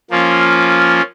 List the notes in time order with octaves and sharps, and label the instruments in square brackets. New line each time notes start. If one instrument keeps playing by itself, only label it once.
[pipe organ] F3 A#3 C#4 F4